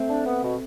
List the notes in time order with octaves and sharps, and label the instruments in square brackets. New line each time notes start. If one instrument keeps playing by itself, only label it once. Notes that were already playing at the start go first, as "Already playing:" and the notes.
Already playing: [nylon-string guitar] A3 C4
[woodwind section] D4
B3
B2